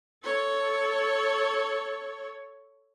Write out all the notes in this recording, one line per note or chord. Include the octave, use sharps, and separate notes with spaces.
A4 C#5